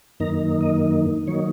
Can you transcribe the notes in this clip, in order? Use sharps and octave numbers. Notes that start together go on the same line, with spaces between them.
F#2 D#3 A#3 D#4 A#5
D#5
D#3 F#3 A#3 D#4 C#5